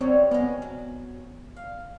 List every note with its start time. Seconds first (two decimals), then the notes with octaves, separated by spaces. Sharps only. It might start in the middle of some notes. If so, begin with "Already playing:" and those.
0.01 D3 G3 C4 C#5
0.31 G#3 B3 C#4
0.62 F#3
1.57 F5